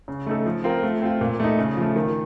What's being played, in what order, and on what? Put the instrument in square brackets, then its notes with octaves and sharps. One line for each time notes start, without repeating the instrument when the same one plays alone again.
[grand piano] C#3
A3 D#4 A4
F3
C4 F4 A#4
A3
C4 F4
A#2
A3 D#4
C#3
F3 A3
D#3